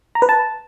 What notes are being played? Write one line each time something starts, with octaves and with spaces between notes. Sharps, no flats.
A#5
B4
A5